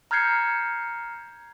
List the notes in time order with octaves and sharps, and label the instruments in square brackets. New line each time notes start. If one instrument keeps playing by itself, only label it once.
[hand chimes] A#5 F6 G6 G#6 C7 C#7